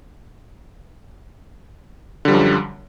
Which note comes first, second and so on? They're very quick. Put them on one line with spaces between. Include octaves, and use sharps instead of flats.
D3 G3 F3 F#2